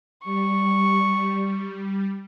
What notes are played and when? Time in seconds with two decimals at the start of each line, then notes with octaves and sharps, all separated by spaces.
0.24 G3 C#6